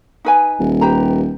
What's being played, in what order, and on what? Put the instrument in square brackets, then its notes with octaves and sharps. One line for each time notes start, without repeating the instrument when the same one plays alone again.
[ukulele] D#4 B4 G#5
[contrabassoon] D#1
[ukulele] G4 B4 A#5